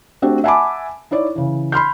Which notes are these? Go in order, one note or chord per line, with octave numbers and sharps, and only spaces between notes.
A3 C4 D4 F#4 G4
E5 F#5 G#5 A5 B5 D6
D#4 E4 C#5 D5
C#3 E3
B5 C6 F6 G6